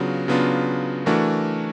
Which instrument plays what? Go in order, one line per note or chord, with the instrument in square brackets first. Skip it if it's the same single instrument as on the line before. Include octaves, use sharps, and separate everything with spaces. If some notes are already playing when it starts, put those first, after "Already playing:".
Already playing: [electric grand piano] C#3 F#3 B3 D4 F4
C#3 F#3 B3 D4 F4
E3 A3 D4 F#4 A#4